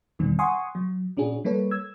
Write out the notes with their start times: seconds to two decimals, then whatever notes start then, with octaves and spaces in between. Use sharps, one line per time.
0.19 E2 B2 D#3 G3 C4
0.39 F#5 G#5 C6 C#6 D#6
0.75 F#3
1.17 A#2 C#4 D4 F#4 G#4
1.44 G3 A#3 A4 B4 C#5
1.71 E6 G#6